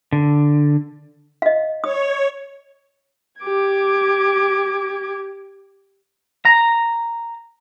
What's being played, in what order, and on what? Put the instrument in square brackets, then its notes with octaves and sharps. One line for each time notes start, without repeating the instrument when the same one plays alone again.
[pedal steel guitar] D3
[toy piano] D#5 F5
[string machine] C#5 [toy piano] D#6
[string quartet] G4 D6 G#6
[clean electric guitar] A#5